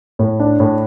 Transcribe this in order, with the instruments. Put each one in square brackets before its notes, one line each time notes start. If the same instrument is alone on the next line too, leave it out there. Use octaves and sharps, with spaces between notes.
[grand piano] A2
D4
A2